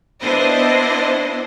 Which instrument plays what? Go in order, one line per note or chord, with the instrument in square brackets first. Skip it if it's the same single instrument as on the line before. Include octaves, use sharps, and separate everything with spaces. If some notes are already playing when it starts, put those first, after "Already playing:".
[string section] B3 D4 E4 C5 D#5